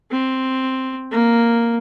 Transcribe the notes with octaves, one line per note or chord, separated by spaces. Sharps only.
C4
A#3